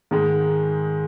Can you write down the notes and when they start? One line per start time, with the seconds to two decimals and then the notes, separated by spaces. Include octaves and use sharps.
0.11 G#2 D#3 G#3 D#4 G#4